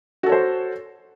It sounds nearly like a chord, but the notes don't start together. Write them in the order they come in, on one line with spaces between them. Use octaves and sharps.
F#4 A4 C#5 C5